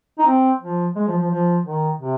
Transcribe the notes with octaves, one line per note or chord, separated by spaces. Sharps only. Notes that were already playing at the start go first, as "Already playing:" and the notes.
D#4
C4
F3
G#3
F3
F3
F3
D#3
C3